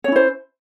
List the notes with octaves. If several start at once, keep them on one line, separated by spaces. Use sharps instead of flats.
C#4 E4 C5 C#5